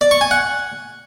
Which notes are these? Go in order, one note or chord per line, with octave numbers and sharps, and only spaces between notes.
D5
C#6
G#5
F#5